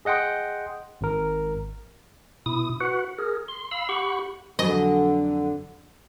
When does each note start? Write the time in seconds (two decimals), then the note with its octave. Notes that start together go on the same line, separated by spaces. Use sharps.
0.05 G#4 D#5 F#5 G5 C6
1.01 G#1 A#4
2.46 B2 E4 D#6
2.81 F#4 B4 F#5
3.18 G#4 A#4
3.48 C6
3.71 F5 B5 E6
3.89 G4 F#5 B5 C#6
4.59 F2 D3 F#3 D#5 G#5